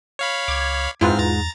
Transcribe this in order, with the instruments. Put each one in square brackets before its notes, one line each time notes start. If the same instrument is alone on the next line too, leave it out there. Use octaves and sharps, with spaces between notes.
[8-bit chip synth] C#5 F5 B5
[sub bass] C#2 [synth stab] D6 G#6
[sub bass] F2 [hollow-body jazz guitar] G#2 [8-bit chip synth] C4 F6 [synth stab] E4 F4 B4
[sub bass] E2 [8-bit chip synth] A#5 A6